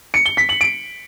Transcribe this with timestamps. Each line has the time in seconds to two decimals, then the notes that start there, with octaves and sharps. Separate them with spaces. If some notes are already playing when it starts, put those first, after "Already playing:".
0.14 C#7
0.26 G7
0.37 B6
0.49 F#7
0.61 D7